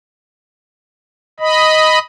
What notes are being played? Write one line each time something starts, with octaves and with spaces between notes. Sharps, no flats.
D#5 B5